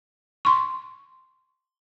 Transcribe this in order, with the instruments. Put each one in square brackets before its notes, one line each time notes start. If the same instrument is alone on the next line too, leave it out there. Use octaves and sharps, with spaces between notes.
[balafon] C6 C#6